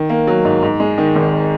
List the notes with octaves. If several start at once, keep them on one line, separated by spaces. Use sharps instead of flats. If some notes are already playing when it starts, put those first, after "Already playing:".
Already playing: D#3
A#3
F#3
G#2
G#2
G#3
D#3
G#1